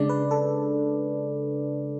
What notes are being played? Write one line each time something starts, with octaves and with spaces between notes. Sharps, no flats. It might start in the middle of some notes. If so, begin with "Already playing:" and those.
Already playing: C#3 G#3 D4 D5
B4
A4